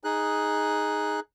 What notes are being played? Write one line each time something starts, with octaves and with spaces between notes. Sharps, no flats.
D#4 G#4 F#6